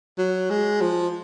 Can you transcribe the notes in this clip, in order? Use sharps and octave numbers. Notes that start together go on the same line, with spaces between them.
F#3
G#3
F3